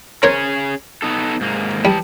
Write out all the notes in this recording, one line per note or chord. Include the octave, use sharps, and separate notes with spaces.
C#4 G#4 A#4 C5 C#5
B3 D#4 A4
G#2 A#3
E3 G3 A5